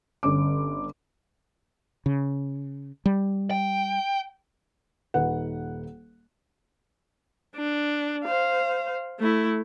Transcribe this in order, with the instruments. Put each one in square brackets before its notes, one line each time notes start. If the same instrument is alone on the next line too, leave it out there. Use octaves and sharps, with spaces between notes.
[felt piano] G1 C#4 D6
[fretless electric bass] C#3
G3
[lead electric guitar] G5
[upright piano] D#1 D#4 B4 F#5
[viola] D4
C5 F5
A3 E4